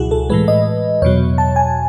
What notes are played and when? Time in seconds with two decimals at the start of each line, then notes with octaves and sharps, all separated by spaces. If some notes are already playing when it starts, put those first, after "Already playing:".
Already playing: C#2 B2 F#3 E4 F#4 G#4
0.11 A4
0.30 A2 E3 G#3 B4
0.48 D#5
1.02 E2 B2 F#3 C#5
1.38 A5
1.56 G#5